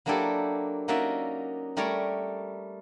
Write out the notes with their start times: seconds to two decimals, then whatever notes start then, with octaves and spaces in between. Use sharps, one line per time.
0.06 F#3 A#3 D4 E4 G4 A4
0.88 A#3 C#4 D#4 F#4 D5 E5
1.77 G3 A3 A#4 C#5 D5 A#5